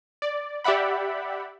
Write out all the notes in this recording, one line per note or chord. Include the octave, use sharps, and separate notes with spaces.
D5
G4 D5 E5 F#5 B5